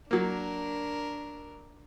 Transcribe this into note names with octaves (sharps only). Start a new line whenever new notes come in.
F#3 A#3 D4 A#4